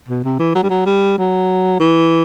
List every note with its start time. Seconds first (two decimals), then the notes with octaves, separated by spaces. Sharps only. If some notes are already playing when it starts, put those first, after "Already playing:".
0.08 B2
0.24 C3
0.39 E3
0.55 F#3
0.63 G3
0.70 F#3
0.86 G3
1.18 F#3
1.80 E3